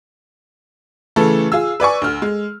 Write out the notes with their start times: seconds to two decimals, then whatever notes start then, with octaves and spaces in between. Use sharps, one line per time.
1.16 C#3 E3 A3 A4
1.52 F4 G#4 E6
1.80 B4 D5 G#5 C#6
2.02 D2 F6
2.22 G#3